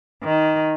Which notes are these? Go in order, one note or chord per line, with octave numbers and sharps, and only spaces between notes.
D#3